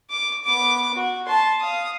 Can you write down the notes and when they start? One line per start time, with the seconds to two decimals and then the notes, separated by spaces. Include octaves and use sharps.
0.10 D6
0.44 B3 D6
0.94 F#4
1.27 A5 C6
1.60 F5 D#6